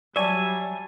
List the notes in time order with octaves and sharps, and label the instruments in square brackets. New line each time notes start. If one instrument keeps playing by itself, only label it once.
[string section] F#3 G3 [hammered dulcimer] C#5 A5 [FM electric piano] D5 [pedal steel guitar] E5 G#5